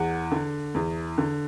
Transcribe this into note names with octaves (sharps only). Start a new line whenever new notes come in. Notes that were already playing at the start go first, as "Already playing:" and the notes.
Already playing: E2 F#5
D3
E2
D3